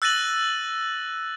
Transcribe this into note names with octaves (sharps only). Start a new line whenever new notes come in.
E6 F#6 A6 A#6 D#7 F#7